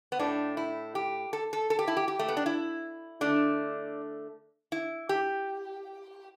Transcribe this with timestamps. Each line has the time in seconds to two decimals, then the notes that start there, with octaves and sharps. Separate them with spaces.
0.12 B3
0.19 A2 A3 D4
0.57 E4
0.95 G4
1.33 A4
1.53 A4
1.70 A4
1.79 G4
1.88 E4
1.97 G4
2.08 G4
2.19 A3
2.28 B3
2.37 D4
2.46 E4
3.21 D3 A3 D4
4.72 E4
5.09 G4